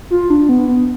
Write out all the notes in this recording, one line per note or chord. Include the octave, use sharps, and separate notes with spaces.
F4
D4
B3
B3